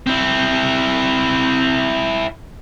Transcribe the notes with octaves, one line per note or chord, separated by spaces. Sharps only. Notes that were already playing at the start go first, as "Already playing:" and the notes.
C4 E4